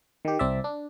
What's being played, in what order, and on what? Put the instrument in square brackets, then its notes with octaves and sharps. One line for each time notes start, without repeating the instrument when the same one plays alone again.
[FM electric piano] D#3 G4
C2 C4 D5 E5
D4